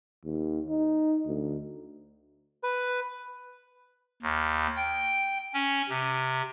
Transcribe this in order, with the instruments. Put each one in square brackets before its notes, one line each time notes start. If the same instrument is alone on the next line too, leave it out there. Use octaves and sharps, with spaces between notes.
[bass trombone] D#2
D#4
D2
[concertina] B4
[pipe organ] D#2
G5
C#4
C3